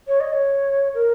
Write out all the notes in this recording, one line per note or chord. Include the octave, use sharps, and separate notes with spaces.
C#5
D#5
C#5
A#4